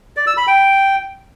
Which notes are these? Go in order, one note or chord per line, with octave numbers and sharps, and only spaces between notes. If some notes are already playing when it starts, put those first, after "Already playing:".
D5
E6
B5
G5